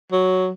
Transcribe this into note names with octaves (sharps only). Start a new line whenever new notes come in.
F#3